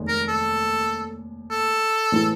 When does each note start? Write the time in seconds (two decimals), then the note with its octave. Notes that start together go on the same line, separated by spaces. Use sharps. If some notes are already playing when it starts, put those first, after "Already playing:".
Already playing: F1 D#2 D#3 G#3
0.08 A#4
0.28 A4
1.51 A4
2.12 A2 E3 G#3 B3